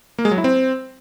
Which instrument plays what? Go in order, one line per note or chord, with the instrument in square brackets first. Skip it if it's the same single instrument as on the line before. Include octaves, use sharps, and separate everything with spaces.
[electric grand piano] A#3
G#3
F#3
E4
C4